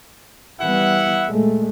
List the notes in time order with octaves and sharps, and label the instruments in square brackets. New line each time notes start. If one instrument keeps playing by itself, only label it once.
[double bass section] E3 G3 B3 [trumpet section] E4 E5 F#5
[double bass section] A#2 G#3 A3